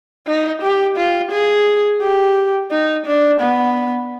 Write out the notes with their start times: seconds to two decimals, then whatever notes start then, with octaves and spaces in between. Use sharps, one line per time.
0.27 D#4
0.62 G4
0.97 F4
1.32 G#4
2.02 G4
2.71 D#4
3.06 D4
3.41 B3